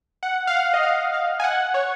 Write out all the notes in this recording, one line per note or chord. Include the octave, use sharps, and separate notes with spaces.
F#5
F5
F#5
D#5
F5
F5
G#5
F#5
F#5
C#5